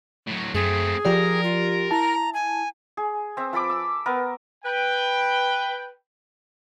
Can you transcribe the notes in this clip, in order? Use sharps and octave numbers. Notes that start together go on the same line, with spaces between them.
A2 F#3
F#2 A3 C4 G#4
F3 G4 A#4 D5
F4
E4 A5 A#5
G#5
G#4
C4 E5
F3 A4 B5 D6
E6
B3 A#4
B4 G5